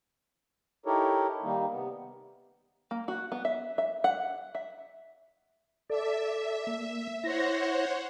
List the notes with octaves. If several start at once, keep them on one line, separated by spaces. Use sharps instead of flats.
D#4 E4 G4 A4 A#4 C#5
D#3 G3 A#3 D#4
C3 B3
A#3
F#4
B3
E5
E5
F#5
E5
A4 D5 E5
A#3
E4 C5 C#5 F#5 A#6